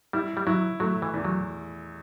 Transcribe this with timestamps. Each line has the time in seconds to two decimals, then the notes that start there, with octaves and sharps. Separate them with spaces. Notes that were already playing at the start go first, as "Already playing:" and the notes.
0.13 G3 E4
0.37 G3
0.47 F#3 E4
0.80 F#3 A3
1.02 E3
1.14 E2
1.25 F#3